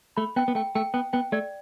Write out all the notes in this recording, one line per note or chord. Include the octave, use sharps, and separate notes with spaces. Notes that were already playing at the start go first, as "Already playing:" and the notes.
A3 B5
B3 G5
B3
A3 G5
A3 G5
B3 G5
B3 G5
A3 D5